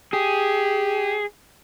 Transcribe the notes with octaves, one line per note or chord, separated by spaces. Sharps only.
G4 G#4